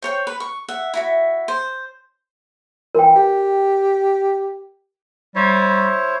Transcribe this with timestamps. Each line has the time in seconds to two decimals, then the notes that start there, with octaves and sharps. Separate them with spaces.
0.02 C5 C#5 G5
0.27 B4
0.40 C#6
0.68 E5 F#5
0.94 E4 F#4 E5
1.48 C5
2.95 E3 A#4 G5
3.16 G4
5.36 G3 E4 C5 C#5